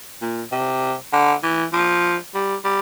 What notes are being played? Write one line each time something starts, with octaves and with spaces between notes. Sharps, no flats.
A#2
C3
D3
E3
F3
G3
G3